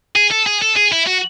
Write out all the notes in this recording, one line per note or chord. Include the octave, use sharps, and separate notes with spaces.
G#4
A4
G#4
A4
G#4
E4
F#4